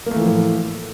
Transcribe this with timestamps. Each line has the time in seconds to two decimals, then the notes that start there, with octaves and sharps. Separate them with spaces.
0.06 A#3
0.11 A3
0.16 E3
0.21 F3
0.26 A2